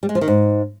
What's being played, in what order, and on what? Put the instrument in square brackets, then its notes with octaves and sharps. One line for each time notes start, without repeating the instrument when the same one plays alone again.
[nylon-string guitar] G3
G#3
F3
D#3
G#2